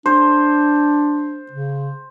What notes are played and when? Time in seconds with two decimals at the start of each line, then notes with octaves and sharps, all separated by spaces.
0.06 D4 C5
1.51 C#3